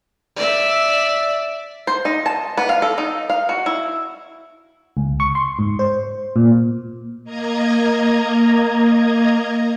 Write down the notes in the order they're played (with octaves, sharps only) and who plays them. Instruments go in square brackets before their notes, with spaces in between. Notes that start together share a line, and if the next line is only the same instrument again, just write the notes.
[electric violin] D5 E5
[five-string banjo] C5
D#4
A5
B3
F5
A4
D#4
F5
F#4
E4
[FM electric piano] C#2
C#6
C6
G#2
C5
A#2
[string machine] A#3 D#5 A#5 G#6